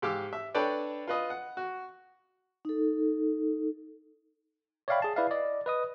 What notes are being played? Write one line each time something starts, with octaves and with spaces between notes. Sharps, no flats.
G#2 G4 F5 D6 E6
E5
D4 A4 B4 C#5 D5 G5
F4 B4 D#5
F#5
F#4
D#4 A4
C#5 D5 E5 F5 G5 B5
G#4 A5
E4 B4 D5 E5 F5
D5 D#5
B4 D#5 D#6